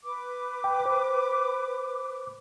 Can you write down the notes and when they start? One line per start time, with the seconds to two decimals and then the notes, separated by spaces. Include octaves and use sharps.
0.04 B4 D6
0.64 G5
0.86 C5